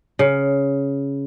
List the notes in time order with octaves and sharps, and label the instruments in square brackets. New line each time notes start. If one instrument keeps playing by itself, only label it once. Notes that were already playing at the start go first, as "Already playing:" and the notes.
[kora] C#3